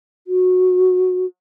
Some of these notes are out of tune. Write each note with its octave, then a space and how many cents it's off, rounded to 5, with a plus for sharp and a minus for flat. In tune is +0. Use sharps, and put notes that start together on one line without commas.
F#4 -15